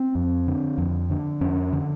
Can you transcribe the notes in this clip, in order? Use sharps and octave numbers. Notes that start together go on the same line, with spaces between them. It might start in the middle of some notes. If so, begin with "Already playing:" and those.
Already playing: C4
F2
D3
F2
D3
F2 C#4
D3